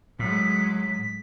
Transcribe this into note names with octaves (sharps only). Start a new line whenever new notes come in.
A2 F#3 G#3 B6